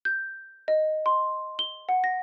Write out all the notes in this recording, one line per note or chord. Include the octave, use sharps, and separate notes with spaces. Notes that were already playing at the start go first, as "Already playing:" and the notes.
G6
D#5
C6
G7
F#5
A#6